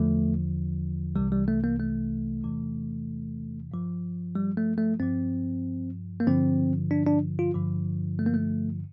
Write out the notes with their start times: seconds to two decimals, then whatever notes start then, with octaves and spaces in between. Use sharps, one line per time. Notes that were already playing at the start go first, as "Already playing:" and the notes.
Already playing: E2 D3 F3 A3
1.15 C2 C3 E3 G3
1.32 G3
1.48 A3
1.64 A#3
1.79 A3
2.44 E2 C3 E3
3.71 G2 F3
4.35 G3
4.57 A3
4.78 A3
4.99 G2 F3 C4
6.20 A#3
6.27 G2 D3 F3 C4
6.91 D4
7.07 D4
7.39 F4
7.54 G2 D3 F3
8.19 A3
8.26 A#3
8.34 A3